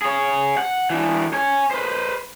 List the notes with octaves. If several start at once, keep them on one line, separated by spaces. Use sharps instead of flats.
G#4 C#5
F#5
E3 D4
C#5 G#5
B4 C5